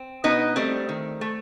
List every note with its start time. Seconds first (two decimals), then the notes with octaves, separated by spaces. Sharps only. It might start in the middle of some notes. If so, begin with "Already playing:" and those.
Already playing: C4
0.24 B2 B3 D#4
0.56 G3 A3 C4
0.89 D#3
1.21 A3